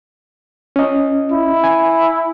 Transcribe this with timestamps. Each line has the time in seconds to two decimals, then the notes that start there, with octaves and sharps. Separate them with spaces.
0.76 C#4 D#5
1.32 E4
1.64 G#5